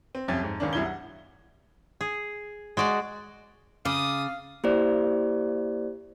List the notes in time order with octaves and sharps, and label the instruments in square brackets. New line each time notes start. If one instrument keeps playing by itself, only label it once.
[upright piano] C4
C2 F2 C#4 C#5 G#6 A6
F2 G#2
C#2 D#3 C#4 D4
C2 F#2 E4 G#6 G7
F#5
[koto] G#4
G#3 F#4 D5
[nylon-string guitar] C#3 [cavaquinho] D5 [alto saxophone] F5 [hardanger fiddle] D#6
[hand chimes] A#3 E4 G4 C5 D5